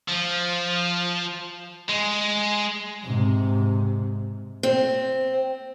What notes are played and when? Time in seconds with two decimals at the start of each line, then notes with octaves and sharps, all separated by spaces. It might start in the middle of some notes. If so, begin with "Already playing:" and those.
0.08 F3
1.89 G#3
3.03 G#2 C3
4.63 C4